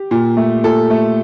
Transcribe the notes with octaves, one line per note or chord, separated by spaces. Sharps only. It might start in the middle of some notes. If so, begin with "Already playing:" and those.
Already playing: G4
A#2
A3
A#2 A4
A3